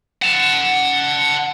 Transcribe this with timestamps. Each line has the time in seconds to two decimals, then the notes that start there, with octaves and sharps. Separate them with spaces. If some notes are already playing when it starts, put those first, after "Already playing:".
0.23 F#5 A5